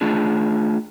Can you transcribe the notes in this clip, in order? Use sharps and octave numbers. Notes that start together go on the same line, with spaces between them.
A3 D4 F4 G#4